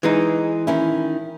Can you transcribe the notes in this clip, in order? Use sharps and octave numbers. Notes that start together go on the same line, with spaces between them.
E3 G#3 D#4
D#3 C#4 E4